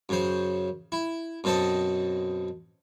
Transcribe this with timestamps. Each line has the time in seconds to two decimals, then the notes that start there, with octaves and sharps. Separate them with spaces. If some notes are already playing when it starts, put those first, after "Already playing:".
0.09 F#2 C#3 C5
0.92 E4
1.44 F#2 B2 C4 A4 D#5